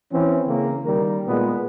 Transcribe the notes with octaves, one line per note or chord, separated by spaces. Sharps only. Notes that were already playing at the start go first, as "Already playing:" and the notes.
E3 C4 C#4
C#3 A#3
D#3 G3 A#4
A#2 G#3 B3